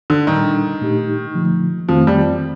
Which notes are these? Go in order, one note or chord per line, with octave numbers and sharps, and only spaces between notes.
D3
A#2 D#3 G3 D4
A#2 A3 D#4 G4
D3 F3 A3
F2 D#3 F3 A3 C4
G3